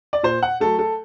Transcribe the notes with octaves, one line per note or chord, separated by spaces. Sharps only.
D5
A#2 C5
F#5
F#3 A3 A4
A4